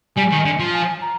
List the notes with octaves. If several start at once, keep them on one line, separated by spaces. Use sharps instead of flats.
G3 G#5
D#3
D3
F3
G#5
A#5